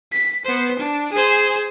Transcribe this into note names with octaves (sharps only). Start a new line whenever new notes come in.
B6
B3 C5
D4
G#4 C5